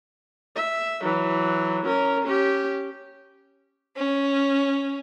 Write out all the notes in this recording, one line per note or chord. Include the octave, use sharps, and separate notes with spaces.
E5
E3 F#3
C#4 A#4
C#4 G4
C#4